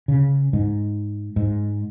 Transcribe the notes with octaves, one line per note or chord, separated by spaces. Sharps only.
C#3
G#2
G#2